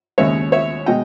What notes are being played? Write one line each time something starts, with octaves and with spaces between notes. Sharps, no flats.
D#2 C#3 G#3 C#5 E5
C#5 E5
B2 G#3 D#5 G5